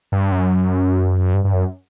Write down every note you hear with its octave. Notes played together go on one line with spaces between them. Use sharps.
G2
F#2
G2
G2
F#2